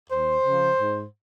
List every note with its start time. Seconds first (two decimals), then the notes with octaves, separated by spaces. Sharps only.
0.10 D#2 C5
0.44 C#3 F3
0.78 G#2